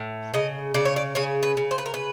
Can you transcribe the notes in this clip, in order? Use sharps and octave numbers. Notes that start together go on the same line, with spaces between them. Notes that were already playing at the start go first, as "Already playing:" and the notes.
Already playing: A2
C#3 D#5
C#3 D5
C#5
D5
C#3 C#5
B4
C#3
C5
B4
A#4
B4